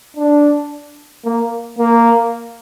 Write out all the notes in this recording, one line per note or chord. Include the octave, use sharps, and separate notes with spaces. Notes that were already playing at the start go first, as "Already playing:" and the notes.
D4
A#3
A#3